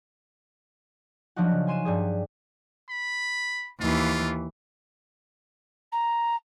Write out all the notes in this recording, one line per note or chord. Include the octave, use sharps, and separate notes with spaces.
F3 F#3 D4 D#4 F#4
C#3
G#5 C6 D#7 E7
G2 G3 G#4
B5
D#2 E3 F4
A#5